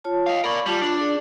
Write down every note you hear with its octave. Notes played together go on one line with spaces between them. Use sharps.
F4 C#5 A5
D#5 F5
A#4 D5 B5 C#6
G3 F4 A5 D6
D4
G#4 D5